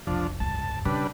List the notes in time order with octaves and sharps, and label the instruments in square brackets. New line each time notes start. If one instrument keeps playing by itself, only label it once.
[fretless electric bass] F1 B1 [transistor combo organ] F3 D4
[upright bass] C#2 G2 [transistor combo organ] A5
[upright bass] C#3 [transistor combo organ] G3 D4 B4